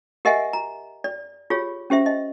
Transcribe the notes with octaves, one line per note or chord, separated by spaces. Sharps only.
G4 A#4 D#5 E5 F#5 G#5
A#5
D5
F4 G4 G#4 C#5
C#4 G4 C5 E5
D#5